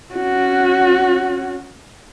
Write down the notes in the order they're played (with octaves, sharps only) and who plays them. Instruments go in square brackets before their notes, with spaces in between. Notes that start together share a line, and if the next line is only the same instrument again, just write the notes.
[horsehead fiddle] C#4 F#4